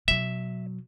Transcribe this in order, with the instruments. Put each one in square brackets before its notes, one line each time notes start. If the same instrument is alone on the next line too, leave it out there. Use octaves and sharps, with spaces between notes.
[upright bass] B2 F#3 [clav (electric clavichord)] E5